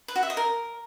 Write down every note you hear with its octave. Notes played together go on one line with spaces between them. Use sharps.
B4
F#4
E5
D#5
A#4